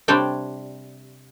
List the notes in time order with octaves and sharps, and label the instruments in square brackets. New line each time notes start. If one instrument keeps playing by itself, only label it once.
[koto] C3 G3 C4 D4 C#5 G5